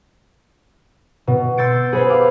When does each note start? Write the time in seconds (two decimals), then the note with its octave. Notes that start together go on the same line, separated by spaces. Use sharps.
1.27 B2
1.57 C6 E6 G6 A6 C#7 D7
1.93 G#4 B4 C5 G#5 B5
2.09 F5 D6